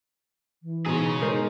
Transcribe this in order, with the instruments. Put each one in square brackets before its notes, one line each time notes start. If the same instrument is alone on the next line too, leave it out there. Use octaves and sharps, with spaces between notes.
[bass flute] E3
[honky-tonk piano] G#2 B2 [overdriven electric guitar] G#4 C#5
[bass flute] G#3 [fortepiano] D#4 A#4 C5